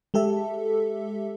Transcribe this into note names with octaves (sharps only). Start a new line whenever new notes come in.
G#3 G4 A4 E5